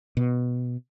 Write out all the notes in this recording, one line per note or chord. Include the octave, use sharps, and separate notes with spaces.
B2